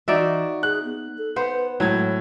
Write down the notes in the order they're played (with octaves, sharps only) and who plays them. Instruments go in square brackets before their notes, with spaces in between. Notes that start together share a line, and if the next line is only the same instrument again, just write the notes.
[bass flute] E3 [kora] D#4 D5 E5 [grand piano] F#4
[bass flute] G#4 [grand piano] F#6
[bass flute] B3
A4
[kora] B3 C5 [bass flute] B4
[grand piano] A2 G#6 [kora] F#3 [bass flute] G#3